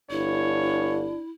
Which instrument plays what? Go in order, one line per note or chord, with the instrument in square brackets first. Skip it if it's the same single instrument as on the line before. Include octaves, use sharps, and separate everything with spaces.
[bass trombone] G1 [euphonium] D4 [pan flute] E4 [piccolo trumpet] C#5